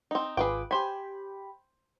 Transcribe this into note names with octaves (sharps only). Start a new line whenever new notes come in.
C4 D#4
G#1 F4 G#4 B4 G5 D6
G4 C5 G5 G#5 B5